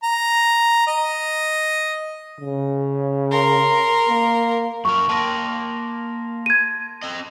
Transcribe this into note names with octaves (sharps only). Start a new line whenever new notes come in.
A#5
D#5
C#3
A#4 C6
A#3
F#2 A#4 C#6
A#3 A#4 G5 A5 C6 A#6
G#6 D#7
C4 D#5